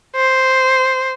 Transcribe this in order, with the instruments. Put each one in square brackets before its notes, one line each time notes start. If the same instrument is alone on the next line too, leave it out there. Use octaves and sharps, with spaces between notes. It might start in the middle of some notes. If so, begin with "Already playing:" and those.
[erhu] C5